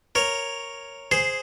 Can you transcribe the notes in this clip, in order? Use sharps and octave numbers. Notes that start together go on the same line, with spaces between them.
A#4 C#5
G#4 C5